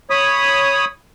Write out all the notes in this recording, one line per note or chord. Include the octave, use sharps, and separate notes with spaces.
C#5 B5 D#6